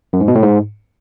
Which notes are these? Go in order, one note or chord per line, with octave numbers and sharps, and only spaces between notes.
F#2
G#2
B2
A2
G#2